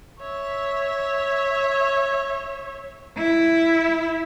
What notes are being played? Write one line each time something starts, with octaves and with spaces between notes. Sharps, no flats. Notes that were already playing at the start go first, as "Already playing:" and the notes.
C#5 E5
E4